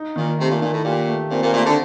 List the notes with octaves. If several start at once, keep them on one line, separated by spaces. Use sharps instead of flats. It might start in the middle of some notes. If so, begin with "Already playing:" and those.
Already playing: D#4
A#2 D#3
C3 A3
A#2
A#2 D#3
A2
A#2 G4
A3
A#2 C4
A#2
A#2 A3
D3